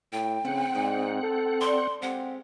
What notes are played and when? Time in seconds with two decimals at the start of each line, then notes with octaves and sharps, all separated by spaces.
0.13 A2 G5
0.45 C#3 F3 C4 B4 F#5
0.75 G#2 A#4 D5 D#5
1.23 A4
1.61 D5 C6
2.02 G#3 C4 G4 F5 F#5